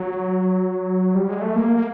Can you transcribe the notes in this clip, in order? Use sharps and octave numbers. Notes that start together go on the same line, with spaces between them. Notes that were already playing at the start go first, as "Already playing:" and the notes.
Already playing: F#3
G3
G#3
A3
A#3
A#3